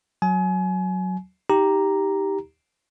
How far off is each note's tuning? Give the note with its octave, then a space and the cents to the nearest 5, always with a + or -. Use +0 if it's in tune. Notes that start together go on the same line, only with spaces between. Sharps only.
F#3 +0 G#5 +30
D#4 +30 G4 +0 A#5 +0